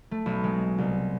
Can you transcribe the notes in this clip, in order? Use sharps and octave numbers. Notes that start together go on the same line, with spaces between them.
A3
B1
G#3
C2